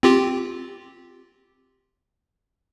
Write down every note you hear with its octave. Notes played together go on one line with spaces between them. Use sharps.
C4 F4 G4